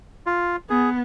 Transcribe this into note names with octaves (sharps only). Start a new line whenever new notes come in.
F4
B3 G#4